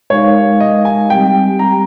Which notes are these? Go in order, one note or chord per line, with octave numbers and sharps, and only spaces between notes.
G#3 D#4 G4 A#4 C#5 F5
D#5
G#5
G3 C4 G4 G5
A#5